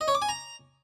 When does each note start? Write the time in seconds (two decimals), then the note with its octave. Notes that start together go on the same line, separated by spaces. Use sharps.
0.01 D#5
0.08 C#5
0.15 D6
0.22 G#5
0.29 A#5